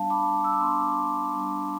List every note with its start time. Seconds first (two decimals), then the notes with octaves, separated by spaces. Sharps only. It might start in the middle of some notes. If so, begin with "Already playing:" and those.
Already playing: G3 B3 D4 F5 A5
0.10 B5 D6
0.44 E6
0.53 D6
0.60 G3 B3 D4 C6 E6
1.35 G3 B3 D4